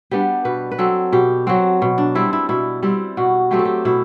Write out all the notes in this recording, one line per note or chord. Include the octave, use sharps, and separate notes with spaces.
G3 B3 D4 G4
B2 B4
B4
F#3 C4 A4
B2 G4
F#3 C4 F#4
B2
D4
G3 C4 E4
E4
B2 E4
G3 C4 E4
B2 F#4
F#3 A3 C4 G4
A4
G4
B2 E4